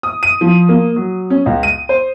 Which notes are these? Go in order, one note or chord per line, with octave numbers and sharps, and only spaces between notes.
D#6
D#7
F3
A#3
F#3
C#4
C#2
D#7
C5